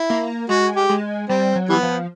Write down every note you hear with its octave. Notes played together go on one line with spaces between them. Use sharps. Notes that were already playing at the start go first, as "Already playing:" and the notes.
Already playing: E4
A#3
G#3 F#4
G4
G#3
G3 C4
F#3
E3 G3 B3
F3